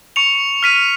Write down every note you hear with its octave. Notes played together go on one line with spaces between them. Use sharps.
C#6 C#7 F7
F6 B6 D#7